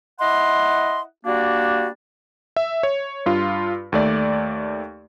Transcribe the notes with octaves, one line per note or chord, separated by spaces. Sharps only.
E4 D#5 F#5 C6
G3 A#3 D4 F#4
E5
C#5
G2 F4
D#2 A3 D5